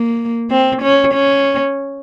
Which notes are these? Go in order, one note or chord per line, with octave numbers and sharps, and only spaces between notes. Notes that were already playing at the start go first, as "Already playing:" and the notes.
Already playing: A#3
C4
C#4
C#4